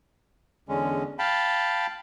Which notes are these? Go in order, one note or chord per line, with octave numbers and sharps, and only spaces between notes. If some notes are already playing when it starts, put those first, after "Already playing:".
E2 D3 G#3 C#4
F5 G5 A5 B5